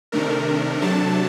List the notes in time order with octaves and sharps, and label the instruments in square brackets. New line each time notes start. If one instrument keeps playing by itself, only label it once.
[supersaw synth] C3 D#3 A3 D4 A#4
C3 F#3 A3 D4 A5